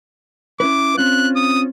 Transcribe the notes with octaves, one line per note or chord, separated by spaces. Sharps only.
C#4 E4 B4 D6
C4 C#4 F4 F#6
D#6